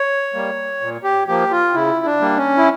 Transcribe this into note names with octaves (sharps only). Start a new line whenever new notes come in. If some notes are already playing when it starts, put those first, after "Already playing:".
Already playing: C#5
G3 A#3
A#2
G4
F3 A#3 G4
F4
C#3 E4
D4
G3 A#3
C#4
E4